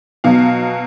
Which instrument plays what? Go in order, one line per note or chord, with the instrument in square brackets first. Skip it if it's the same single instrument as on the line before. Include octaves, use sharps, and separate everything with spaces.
[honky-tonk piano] B2 F#3 F5